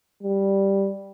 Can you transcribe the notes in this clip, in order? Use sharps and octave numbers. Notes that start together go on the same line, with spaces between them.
G3